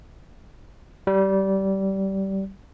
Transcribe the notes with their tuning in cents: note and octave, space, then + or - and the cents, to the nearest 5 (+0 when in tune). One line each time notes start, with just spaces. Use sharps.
G3 -20